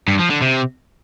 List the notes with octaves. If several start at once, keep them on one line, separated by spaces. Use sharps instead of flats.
G2
F3
D3
C3